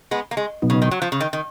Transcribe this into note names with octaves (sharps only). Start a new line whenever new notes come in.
G#3 B3
A#3
G#3
B2 F#3 B3 D#4
C#3
D#3
F#3
F3
C#3
D#3
D#3